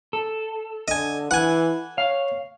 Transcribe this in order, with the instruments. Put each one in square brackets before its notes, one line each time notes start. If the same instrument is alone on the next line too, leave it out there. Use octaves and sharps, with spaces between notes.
[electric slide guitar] A4
[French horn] D3 [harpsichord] D#5 G#5
[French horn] E3 [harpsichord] F#5 G#5
[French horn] C#5 [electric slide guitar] F5